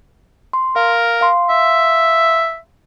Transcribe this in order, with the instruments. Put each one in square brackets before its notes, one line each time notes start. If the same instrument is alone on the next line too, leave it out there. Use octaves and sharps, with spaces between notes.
[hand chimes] C6
[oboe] A#4 [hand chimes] F5
[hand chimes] F5 C6
[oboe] E5